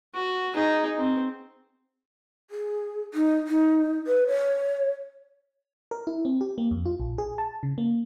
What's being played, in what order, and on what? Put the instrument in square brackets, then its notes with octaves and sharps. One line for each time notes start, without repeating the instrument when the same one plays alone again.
[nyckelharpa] F#4
D#4 G#4
C4
[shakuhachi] G#4
D#4
D#4
B4
C#5
[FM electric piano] A#4
E4
C4
G4
A#3
F2
F4
A#1
G#4
A5
C#3
A#3